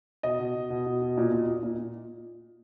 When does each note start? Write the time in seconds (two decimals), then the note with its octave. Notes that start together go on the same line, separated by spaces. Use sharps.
0.23 B2 D#5
0.39 B2
0.55 B2
0.70 B2
0.86 B2
1.02 B2
1.17 A#2
1.32 A#2
1.48 A#2
1.63 A#2
1.79 A#2